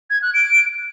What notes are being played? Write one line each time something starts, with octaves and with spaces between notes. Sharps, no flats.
G#6
F#6
D7